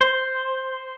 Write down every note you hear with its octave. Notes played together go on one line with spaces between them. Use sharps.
C5